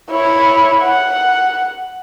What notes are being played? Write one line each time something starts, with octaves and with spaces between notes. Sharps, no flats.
E4 C#5
F#5